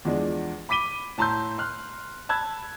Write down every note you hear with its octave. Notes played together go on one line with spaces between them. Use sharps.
E2 F3 G#3 D4
B5 D6 B6 D#7 G7
A2 A5 A#5 C6 E6 G6
C6 F6 F#6
A5 B5 E6 F#6 G#6